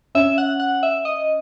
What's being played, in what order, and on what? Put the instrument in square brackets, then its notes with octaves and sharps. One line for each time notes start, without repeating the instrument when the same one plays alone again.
[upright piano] C#4 [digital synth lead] E5
[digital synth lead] F#5
F#5
E5
D#5